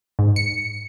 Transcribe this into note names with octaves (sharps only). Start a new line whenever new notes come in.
G#2
C#7